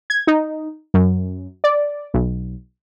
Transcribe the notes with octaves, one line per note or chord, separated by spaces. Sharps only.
G#6
D#4
F#2
D5
B1